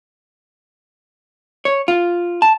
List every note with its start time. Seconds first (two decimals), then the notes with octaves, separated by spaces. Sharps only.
1.65 C#5
1.88 F4
2.42 A5